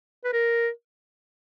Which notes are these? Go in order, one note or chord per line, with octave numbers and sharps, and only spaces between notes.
B4
A#4